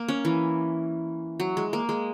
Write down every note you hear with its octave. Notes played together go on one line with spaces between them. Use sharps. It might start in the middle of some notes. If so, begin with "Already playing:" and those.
Already playing: A#3
C#4
E3
F#3
G#3
A#3
G#3